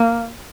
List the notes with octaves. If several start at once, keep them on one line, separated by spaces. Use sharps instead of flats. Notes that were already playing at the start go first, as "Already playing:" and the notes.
Already playing: A#3